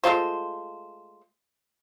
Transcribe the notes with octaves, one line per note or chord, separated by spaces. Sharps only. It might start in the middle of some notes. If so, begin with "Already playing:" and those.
G#3 A3 F4 C5